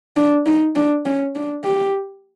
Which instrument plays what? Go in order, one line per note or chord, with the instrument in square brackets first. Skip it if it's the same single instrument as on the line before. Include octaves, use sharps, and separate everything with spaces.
[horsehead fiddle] D4
D#4
D4
C#4
D4
G4